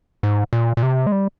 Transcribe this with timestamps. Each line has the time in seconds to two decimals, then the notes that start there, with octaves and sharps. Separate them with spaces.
0.23 G#2
0.53 A#2
0.77 A#2
0.83 C3
1.06 G#3
1.12 G3